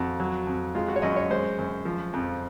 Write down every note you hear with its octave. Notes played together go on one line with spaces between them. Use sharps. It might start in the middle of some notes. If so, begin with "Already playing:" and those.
Already playing: F2 F#4
F#3
F2
G#3 F4
F#4
C#5
F#2 D#5
C#5
G#3 C5
F#2
F3
F2